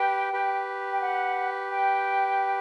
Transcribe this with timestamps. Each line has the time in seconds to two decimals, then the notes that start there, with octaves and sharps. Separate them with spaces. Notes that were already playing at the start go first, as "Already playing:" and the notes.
Already playing: G4 B4 G5
0.33 G4 B4
0.92 G5
1.02 F#5
1.70 G5